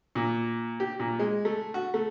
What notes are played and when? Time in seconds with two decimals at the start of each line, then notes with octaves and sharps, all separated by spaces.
0.15 A#2
0.80 G4
1.00 A#2
1.19 G#3
1.45 A3
1.74 F#4
1.94 A3